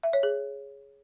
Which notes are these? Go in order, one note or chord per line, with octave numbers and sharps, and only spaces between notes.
E5
C#5
G#4